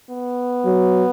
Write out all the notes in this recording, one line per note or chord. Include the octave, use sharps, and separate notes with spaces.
B3
F#3